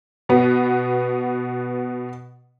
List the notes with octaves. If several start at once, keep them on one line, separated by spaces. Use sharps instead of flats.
B2 B3